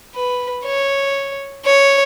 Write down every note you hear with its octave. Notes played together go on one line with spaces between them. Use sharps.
B4
C#5
C#5